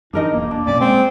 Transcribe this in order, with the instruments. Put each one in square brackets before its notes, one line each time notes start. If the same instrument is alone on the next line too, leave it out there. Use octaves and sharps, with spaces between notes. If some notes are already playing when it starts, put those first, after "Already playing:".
[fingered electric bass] F#2 E3 [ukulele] D4 A#4 D#5 [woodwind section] D#4
[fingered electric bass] E1 B1 E2 [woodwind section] A#3
[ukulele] D4
[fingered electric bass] A#1 F#2 B2 [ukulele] C#4 [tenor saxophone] D5
[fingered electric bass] G#3 [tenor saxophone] C4